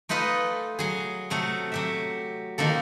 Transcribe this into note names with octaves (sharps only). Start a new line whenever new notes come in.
A3 D#4 F4 B4 D#5
F#3 G#4
C3 F#3 A3
F#3 G4 E5
D#3 F3 A#3 A4